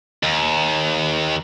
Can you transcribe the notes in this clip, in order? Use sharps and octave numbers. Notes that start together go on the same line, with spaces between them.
D#2